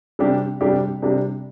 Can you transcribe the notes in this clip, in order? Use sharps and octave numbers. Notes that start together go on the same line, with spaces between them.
C3 G3 D4 G4
C3 G3 D4 G4
C3 G3 D4 G4